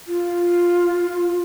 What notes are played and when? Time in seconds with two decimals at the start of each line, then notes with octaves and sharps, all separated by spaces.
0.08 F4